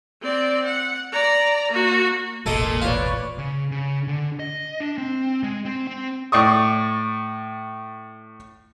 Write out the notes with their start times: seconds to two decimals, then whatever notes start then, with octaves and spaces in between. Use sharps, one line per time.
0.22 C4 D5
0.65 F#5
1.12 D5 A#5
1.71 A#3 F#4
2.46 E1 A1 A#2 A4 D#5
2.82 F4 B4 C#5 D5
3.38 C#3
3.71 C#3
4.08 D3
4.40 D#5
4.80 D4
4.98 C4
5.43 G#3
5.65 C4
5.87 C4
6.32 A2 D5 C#6 D#6